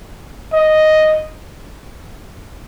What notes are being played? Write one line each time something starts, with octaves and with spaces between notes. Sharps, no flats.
D#5